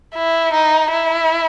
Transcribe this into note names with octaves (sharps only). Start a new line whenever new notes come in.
E4
D#4
E4